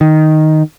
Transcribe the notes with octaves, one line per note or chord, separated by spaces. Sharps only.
D#3